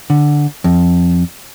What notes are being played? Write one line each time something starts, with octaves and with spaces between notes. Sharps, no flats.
D3
F2